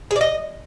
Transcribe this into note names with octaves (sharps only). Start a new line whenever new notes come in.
G#4
D5
D#5